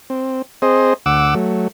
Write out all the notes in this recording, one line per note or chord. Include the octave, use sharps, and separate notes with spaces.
C4
C4 G#4 C5 D#5
D2 F#5 D6 E6
F#3 A3